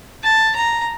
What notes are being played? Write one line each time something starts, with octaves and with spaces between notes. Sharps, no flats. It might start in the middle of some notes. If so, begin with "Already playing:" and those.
A5
A#5